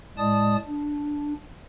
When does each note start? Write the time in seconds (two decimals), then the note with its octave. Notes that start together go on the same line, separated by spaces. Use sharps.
0.18 A2 G#3 D5 A5 D#6
0.67 D4